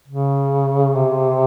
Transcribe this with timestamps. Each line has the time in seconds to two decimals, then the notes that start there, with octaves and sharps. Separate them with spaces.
0.08 C#3
0.96 C3